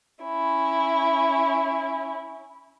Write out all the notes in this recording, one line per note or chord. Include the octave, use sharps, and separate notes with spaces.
C#4 E4